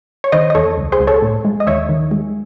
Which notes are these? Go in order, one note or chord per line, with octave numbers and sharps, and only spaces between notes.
C#5
D#3 C5 D#5
D#5
E2 A4 C#5
C#2
G#4 C5
C#2
A4 C#5
A2
G#3
D#5
D#2 C#5 E5
D#3
G#3